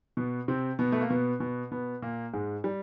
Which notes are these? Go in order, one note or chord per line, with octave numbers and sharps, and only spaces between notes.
B2 B3
C3 C4
B2 B3
A3
A#3
B2 B3
B2 B3
B2 B3
A#2 A#3
G#2 G#3
G3